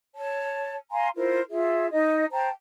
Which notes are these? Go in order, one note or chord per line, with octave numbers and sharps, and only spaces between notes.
C#5 A5
F5 G#5 A#5 C6
E4 F4 A#4 C5
F4 G#4 E5
D#4 D#5
C5 G5 A5 A#5